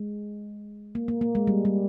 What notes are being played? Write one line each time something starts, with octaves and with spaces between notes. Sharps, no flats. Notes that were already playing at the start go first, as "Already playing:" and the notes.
Already playing: G#3
A#3
A#3
A#3
G#3
G3
G3